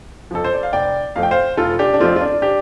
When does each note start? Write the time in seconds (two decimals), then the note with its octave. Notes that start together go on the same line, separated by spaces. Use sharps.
0.31 F2 F3 A4
0.44 C5
0.54 D5
0.63 F5
0.73 F1 D5 G5
1.16 F2 F3 A3 F5
1.23 G5
1.31 C5 F5
1.57 F1 F4 A4
1.79 D4 G4
1.94 D4
2.00 F2 F3 A3 C4 F4
2.16 F4
2.21 D4
2.42 D4 G4